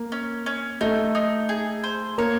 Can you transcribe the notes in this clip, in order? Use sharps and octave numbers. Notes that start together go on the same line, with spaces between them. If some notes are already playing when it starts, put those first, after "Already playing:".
Already playing: A#3
C#4
C#4
A3 D#4
D#4
G#4
C5
A#3 C#5